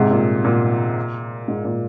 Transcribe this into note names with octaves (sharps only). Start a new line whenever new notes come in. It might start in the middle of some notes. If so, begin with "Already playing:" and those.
Already playing: G#2 C3
A#2
A#2
G#2
A#2